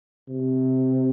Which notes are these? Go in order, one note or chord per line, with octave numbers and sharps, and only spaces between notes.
C3